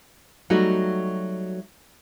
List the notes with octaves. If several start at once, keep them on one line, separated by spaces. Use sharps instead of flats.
F#3 G3 A3 D#4 F#4